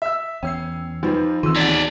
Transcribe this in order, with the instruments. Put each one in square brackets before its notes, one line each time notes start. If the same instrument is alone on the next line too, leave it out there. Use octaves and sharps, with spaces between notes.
[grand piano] E5 E6
[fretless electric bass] E2 [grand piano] C#4 [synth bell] G5 E6 C7
[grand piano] F2 F3 [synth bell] D#4 B4
[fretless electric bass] D#3 E3 C4 [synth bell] F4 D#7 [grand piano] C6 E6
[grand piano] D1 A#5 B6 [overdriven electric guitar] D#4 D5 [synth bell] F#5 G#6